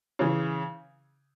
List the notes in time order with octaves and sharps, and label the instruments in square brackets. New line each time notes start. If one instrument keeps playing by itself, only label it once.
[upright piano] C#3 E3